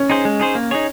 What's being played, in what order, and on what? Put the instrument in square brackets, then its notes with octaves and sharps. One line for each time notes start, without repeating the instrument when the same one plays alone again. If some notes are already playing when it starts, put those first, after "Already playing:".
Already playing: [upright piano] C#4
[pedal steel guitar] D#4 G#4 C5
G#3
D#4 G#4 C5
A#3
D#4 G#4 C#5